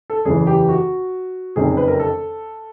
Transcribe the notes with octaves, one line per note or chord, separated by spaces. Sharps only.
A4
F#1 E2 C#3 E3 G#4
G4
F#4
F#1 F2 C3 D#3 G#4
B4
A#4
A4